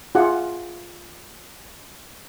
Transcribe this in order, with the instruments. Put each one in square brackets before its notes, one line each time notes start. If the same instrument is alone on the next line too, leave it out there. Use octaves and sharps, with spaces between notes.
[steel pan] F4 G#4 E5 F#5 D6